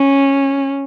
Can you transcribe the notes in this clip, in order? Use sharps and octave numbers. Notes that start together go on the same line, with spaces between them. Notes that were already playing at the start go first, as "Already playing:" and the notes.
Already playing: C#4